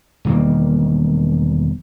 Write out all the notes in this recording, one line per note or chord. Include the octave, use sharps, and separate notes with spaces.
E1 D#3 G3 A#3